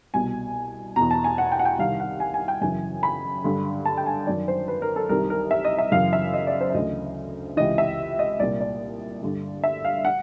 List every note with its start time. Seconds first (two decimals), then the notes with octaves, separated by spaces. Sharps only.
0.14 C2 B2 G#5
0.96 E2 B2 A#5
1.11 A5
1.24 G#5
1.38 F#5
1.52 G5
1.59 F#5
1.65 G5
1.79 C2 C3 D#3 F5
2.00 F#5
2.20 G#5
2.34 G#5
2.48 G5
2.62 F#2 C#3 E3 G#5
3.03 B5
3.44 G2 D3
3.85 A5
3.97 G5
4.06 G#5
4.27 F#2 D#3 D5
4.48 C5
4.68 B4
4.82 A#4
4.96 A4
5.09 C2 C3 D#3 A#4
5.30 A#4
5.51 E5
5.64 D#5
5.78 E5
5.92 F#2 C#3 E3 F5
6.13 E5
6.33 D#5
6.47 D5
6.61 C5
6.70 E5
6.74 D2 C#3 E3 D#5
7.57 C#2 C3 E3 D#5
7.78 E5
8.19 D#5
8.40 C2 A#2 D5
8.61 D5
9.23 G2 D3
9.64 E5
9.84 F5
10.05 F#5